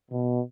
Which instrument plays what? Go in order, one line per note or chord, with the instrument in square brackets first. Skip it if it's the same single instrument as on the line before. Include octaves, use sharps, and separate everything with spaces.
[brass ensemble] B2